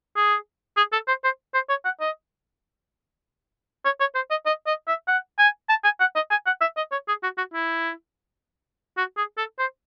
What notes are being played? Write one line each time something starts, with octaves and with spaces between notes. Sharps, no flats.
G#4
G#4
A4
C5
C5
C5
C#5
F#5
D#5
C#5
C#5
C5
D#5
D#5
D#5
E5
F#5
G#5
A5
G#5
F#5
D#5
G#5
F#5
E5
D#5
C#5
G#4
F#4
F#4
E4
F#4
G#4
A4
C5